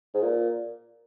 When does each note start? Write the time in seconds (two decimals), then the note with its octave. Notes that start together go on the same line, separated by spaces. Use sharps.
0.14 G#2
0.22 A#2